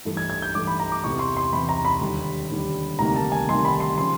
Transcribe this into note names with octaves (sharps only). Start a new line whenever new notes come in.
G2 E3 A3
G#6
G#6
G6
G2 E3 A3 D6
B5
A#5
D6
E2 C3 E3 C#6
C6
C6
E2 C3 E3 B5
A#5
B5
D#2 D3 G3
D#2 D3 G3
D2 C3 D#3 G3 A#3 A#5
A5
G#5
D2 C3 D#3 G3 A#3 C6
B5
C6
C#3 F3 C6